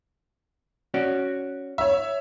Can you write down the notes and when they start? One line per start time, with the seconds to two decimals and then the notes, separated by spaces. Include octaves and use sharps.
0.94 C#4 F#4 D5
1.78 C#5 E5